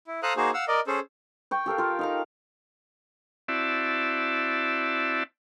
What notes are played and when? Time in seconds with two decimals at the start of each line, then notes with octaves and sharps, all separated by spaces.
0.07 E4
0.23 A4 C5 F5 A#5 D#6 F#6
0.36 A#3 D#4 F#4 G#4 C5
0.54 F5 F#5 E6
0.68 A#4 D5 D#5
0.87 C#4 G#4 A4 C5
1.51 G5 C#6
1.66 G4 A4 A#4 F5
1.78 F4 A#4
1.99 D#4 F5 A#5
3.48 C4 E4 F#4 D5 E5 A5